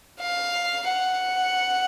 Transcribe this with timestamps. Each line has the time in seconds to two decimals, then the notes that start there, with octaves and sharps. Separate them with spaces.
0.20 F5
0.89 F#5